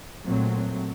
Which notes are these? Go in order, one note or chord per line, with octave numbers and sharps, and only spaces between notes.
A#2 F#3 A3 C4